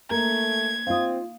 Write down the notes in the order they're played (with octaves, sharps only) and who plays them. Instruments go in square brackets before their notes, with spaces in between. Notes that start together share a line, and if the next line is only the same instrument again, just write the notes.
[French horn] A3 [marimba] A#3 [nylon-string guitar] A#4 [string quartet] G#6
[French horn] C4 [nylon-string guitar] D#4 F4 [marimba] F5 D#6